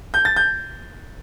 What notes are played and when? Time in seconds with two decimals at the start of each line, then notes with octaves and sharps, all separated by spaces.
0.14 G6
0.25 A6
0.36 G6